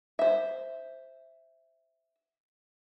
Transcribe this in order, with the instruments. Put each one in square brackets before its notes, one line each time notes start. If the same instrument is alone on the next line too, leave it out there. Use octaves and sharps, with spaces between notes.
[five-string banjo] C5 E5